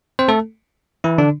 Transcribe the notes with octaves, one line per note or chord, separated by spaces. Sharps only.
C4 C5
A3 A4
E3 E4
D3 D4